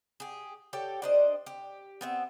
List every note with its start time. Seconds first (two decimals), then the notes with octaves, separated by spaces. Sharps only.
0.20 G4 G#4
0.73 G4 A4 C#5 G5
1.02 D4 C5 D#5
1.46 G4
2.01 B3 C4 E5